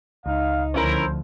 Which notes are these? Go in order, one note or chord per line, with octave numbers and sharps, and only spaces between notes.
C#2 D#4 F5
D2 F3 C#4 E4 A#4 C5